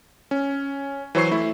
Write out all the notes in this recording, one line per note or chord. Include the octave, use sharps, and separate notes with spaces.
C#4
E3 F#3 C5 C#6 C7
A3 E4